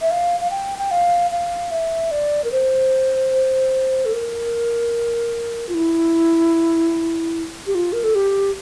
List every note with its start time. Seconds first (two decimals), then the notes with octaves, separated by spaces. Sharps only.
0.01 E5
0.11 F5
0.40 F5
0.51 G5
0.79 G5
0.91 F5
1.31 F5
1.71 E5
2.11 D5
2.44 A#4
2.52 C5
4.05 A4
4.13 A#4
5.69 F4
5.74 E4
7.67 G4
7.75 F4
7.93 A#4
8.04 A4
8.15 G4